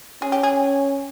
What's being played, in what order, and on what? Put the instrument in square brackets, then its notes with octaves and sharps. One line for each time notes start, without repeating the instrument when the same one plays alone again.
[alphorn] C#4 [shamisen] G#4
[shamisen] G4
G#4